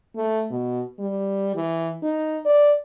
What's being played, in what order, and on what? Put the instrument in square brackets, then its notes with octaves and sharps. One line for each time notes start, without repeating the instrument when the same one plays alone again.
[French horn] A3
B2
G3
E3
D#4
D5